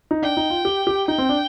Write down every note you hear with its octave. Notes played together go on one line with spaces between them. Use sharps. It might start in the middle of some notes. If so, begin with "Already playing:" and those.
D#4
D4 G5
D#4
F4
G4
G4
D#4 G5
C4
D4